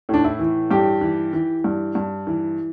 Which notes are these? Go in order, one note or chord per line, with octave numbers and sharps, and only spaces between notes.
A2 D4
E4
E3
G2 G4
E3
E3
G2
G2
E3